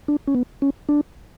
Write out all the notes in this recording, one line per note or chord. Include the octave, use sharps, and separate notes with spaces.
D4
C#4
B3
C#4
D4